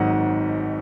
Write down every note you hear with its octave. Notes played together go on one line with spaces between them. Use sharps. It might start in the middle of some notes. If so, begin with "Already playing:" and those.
Already playing: G#1 G#2 F#3 D#5 F#5